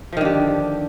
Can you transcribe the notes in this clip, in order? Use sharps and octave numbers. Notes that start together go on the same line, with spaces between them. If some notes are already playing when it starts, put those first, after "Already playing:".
D3 D#3 F3 G4